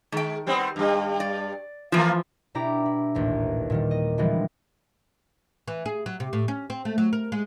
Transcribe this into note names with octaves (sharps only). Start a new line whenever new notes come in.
D#3 G#3 G5
G3 B3 C4
G2 G3
D5
E3 F3 A3 A#3 F4
B2 D4 E4 G4 A#5 D6
E4
A1 D#2 A#2
A#2 D#3 G3
D#5
D3 E3 F3 G3 G#3 B3
E3
G#4
F#3
C3
A2
C#4
C4
A3
F#3
A#4
G#3